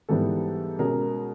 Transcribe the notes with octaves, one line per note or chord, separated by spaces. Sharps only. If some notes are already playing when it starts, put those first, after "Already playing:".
G#2 E3 G3 B3 A4
B2 G#3 C#4 G#4 A#4